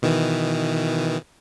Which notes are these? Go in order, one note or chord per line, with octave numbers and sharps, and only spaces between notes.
B2 D#3 E3